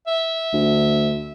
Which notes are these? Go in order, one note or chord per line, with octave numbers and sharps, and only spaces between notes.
E5
D2